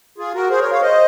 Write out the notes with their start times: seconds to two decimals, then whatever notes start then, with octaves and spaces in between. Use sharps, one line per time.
0.18 F4 G#4
0.34 F#4 A#4
0.50 G#4 C5
0.61 A#4 C#5
0.71 C#5 F5
0.82 C5 D#5